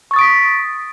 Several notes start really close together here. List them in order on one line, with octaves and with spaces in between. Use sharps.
C#6 A6 D#6 D7 B6